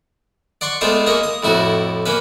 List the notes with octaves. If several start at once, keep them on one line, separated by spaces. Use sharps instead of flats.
D5 F#5 C6 C#6
G#3 A3 B3 F4 C5 D5
A#3 C#4 G#4 D#5
D#6
F2 A2 E4 F#4
A#3 C#4 B4